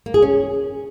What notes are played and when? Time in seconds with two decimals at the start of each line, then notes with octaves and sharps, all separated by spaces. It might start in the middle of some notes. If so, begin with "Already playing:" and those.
0.06 A#3
0.14 G#4
0.22 C#4